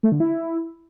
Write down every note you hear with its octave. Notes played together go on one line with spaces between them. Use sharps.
A3
D3
E4